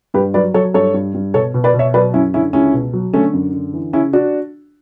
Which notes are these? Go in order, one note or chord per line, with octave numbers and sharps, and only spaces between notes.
G2 G4 B4
F#3 B4 D5
F#3 A4 C#5
G2 A4 C#5
G2
G2
B2 A4 C#5
B2
B4 D5
B2
C#5 E5
F#3 B4 D5
F#2 C#4 E4
D3 C#4 E4
C#2 C#4 E4
B2
F#3
D3 A3 C#4
F#2
D3
E3
C#3 C#4 E4
D4 F#4